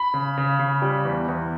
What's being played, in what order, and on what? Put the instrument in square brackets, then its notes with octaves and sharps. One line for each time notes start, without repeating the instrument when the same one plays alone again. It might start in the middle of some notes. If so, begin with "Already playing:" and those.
Already playing: [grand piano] B5
C#3
C#3
C#3
G3
E2
E2